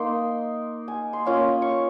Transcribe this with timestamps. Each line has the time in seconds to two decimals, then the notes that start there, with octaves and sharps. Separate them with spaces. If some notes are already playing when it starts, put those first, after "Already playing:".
Already playing: A#3 D#4 C6
0.88 G#5
1.13 C6
1.25 A#3 C#4 F4
1.62 C#6